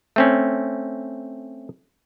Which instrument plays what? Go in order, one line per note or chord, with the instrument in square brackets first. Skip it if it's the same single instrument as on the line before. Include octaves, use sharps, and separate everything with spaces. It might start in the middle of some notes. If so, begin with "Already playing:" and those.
[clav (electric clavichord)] A3 C4 C#4